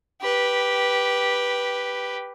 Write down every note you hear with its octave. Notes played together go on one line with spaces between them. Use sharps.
G4 B4